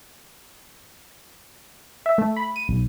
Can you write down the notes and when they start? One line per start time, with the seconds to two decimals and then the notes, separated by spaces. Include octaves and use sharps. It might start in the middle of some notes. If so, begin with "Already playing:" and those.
2.06 E5
2.18 A3
2.37 B5
2.56 D#7
2.68 B1